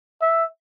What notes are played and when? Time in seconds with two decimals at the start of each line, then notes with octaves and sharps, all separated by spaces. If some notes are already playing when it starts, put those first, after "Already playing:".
0.22 E5